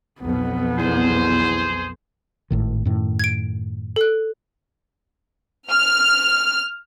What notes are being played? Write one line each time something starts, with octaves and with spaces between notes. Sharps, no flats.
B1 F2 B2 B3
E2 G#4 C5
G#1 A2 D#3
F#2 A2 D#3
G#6 D7
A4 F#6
F6